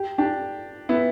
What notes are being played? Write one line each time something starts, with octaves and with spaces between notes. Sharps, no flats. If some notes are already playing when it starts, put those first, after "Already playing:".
Already playing: G4
D4 G4
B3 E4